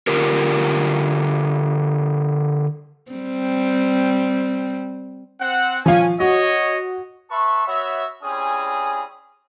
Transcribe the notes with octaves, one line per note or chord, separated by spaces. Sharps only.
D3 F4 G4 A#4
G3 C4
C4 F#5
F3 C#4 F5 G#5
F#4 C#5 D#5
B4 E5 A5 C6 C#6
B3 F#4 C#5 E5
G3 C4 C#4 E4 G#4 D#6